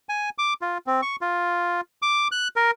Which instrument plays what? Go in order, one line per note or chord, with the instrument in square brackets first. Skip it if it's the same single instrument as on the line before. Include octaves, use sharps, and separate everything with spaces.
[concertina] G#5
D6
F4
C4
C#6
F4
D6
F#6
A#4